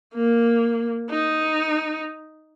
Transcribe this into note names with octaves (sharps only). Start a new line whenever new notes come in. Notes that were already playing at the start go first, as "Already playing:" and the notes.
A#3
D#4